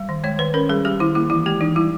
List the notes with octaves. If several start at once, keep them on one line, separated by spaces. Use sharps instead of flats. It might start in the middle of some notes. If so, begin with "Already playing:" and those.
Already playing: G3
D#3
G#3 C#5
D#3 B4
C#4 A#4
G3 G#4
G3 G4
D#3 E4
A#3 E4
E3 E4
G#3 G4
E3 D#4
G3 E4